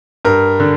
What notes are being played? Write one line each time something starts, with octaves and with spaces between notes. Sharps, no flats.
G2 A#4
D3